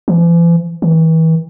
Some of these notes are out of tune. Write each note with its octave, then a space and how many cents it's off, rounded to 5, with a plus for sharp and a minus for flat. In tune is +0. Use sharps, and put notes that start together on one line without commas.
E3 +45
E3 -35